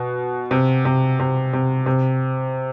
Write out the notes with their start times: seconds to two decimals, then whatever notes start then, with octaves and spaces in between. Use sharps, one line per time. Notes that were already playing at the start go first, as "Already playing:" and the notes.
Already playing: B2
0.51 C3
0.85 C3
1.19 C3
1.53 C3
1.86 C3